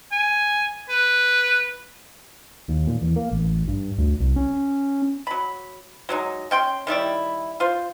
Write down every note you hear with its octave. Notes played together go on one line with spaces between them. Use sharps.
G#5
B4
D#2
A#2
E2
A#3
A1
G2
D2
C2
C#4
F#3 B5
F#3 G#3 D#4
C#4 G5 C6
D#3 G3 E4 D5
F4 C5